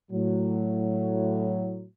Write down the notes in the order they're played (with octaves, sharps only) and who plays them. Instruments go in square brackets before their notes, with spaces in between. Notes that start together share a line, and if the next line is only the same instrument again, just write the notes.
[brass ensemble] A2 F#3